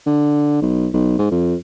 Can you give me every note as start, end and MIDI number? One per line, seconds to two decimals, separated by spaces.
0.07 0.61 50
0.62 0.88 35
0.93 1.14 35
1.18 1.30 44
1.31 1.55 41